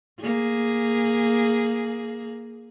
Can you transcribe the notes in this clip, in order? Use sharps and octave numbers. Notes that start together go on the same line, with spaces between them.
A#3 G#4